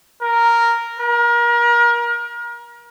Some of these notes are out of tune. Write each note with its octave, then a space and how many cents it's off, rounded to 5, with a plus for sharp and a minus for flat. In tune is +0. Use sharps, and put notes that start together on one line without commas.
A#4 +0
A#4 +30